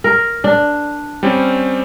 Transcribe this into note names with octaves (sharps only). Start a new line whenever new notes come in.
A#4
D4
G3 C4 C#4